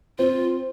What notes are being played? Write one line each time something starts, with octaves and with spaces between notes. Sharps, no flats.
C4 F4